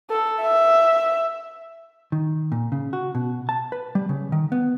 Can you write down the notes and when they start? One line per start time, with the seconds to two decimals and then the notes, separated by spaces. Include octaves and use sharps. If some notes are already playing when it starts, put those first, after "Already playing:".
0.10 A4
0.42 E5
2.12 D#3
2.52 A#2
2.72 C#3
2.93 F#4
3.15 B2
3.49 A5
3.72 B4
3.95 G3
4.09 C#3
4.32 D#3
4.52 B3